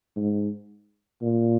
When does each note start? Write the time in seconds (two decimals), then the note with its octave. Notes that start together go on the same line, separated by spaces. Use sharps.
0.16 G#2
1.22 A#2